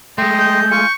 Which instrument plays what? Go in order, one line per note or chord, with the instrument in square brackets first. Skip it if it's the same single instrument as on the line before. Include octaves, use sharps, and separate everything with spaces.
[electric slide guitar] G#3 A3 [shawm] D#5 [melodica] G5 C6
[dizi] G6
[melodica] F4 G#5 [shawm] C#6